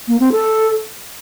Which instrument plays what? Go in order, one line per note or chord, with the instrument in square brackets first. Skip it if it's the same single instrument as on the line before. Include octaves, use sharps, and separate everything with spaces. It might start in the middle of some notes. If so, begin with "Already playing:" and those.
[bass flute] A#3
C4
A4